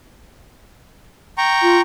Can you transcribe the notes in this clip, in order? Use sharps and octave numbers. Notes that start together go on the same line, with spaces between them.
G5 A#5 C#6
F4